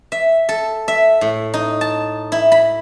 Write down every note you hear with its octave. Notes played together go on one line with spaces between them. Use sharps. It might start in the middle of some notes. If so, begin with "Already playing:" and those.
E5
A4
E5
A2
D#4
A5
E4
B5